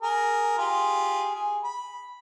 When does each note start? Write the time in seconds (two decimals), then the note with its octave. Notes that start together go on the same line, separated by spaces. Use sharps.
0.02 G#4 A#4
0.58 F4 G4 G#4
1.34 G#4
1.63 B5